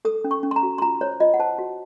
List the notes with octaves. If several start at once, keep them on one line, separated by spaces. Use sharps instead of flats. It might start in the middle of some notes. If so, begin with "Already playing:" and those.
A4 D#6
C#4
C#6
C#4
C6
A#5
F#4
C6
F4 A#5
C5 C#5
F4 D#5
F#5
C5 A5
F#4